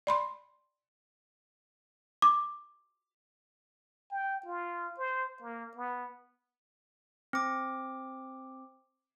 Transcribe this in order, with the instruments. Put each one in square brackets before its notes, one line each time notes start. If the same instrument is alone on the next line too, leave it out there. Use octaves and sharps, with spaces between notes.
[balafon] D5 B5 C6
[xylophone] D6
[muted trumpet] G5
F4
C5
A#3
B3
[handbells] C4 D6